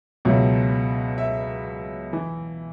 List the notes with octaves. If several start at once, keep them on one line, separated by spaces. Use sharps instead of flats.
C#2 B2 F#3 E5
E5
E3